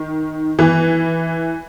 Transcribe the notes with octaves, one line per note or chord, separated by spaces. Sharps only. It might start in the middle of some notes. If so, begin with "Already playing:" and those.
Already playing: D#3
E3